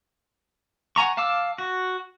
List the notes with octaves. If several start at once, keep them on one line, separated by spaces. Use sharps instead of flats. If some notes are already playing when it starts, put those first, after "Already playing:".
F#5 G#5 A#5 C#6
F5 A5 D6 E6
F#4